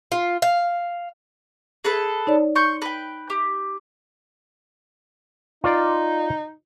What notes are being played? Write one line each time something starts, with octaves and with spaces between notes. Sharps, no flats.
F4
F5
G#4 A4 B4
D#4 C#5 D5
C6 C#6 G6
B4 G5
G4
D#4 F4 D5